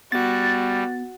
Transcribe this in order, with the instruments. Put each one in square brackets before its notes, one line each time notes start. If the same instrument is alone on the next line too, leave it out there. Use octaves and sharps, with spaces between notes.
[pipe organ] G3 [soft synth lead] B3 [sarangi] F#4 [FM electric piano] A6